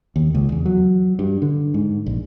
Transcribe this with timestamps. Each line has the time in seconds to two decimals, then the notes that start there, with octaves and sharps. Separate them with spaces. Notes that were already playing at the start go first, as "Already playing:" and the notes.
0.16 D#2
0.34 C#2
0.52 E2
0.66 F#3
1.19 G2
1.42 D3
1.74 G#2
2.06 A#1